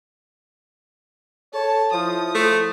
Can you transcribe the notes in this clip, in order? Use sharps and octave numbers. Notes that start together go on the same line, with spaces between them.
A4 C#5 A5
F3 E4 D#6
A3